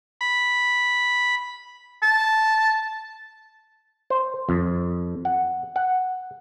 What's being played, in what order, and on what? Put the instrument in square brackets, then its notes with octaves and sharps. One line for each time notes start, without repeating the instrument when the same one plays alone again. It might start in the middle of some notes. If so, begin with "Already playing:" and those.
[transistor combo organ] B5
[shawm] A5
[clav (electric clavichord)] C5
F2
F#5
F#5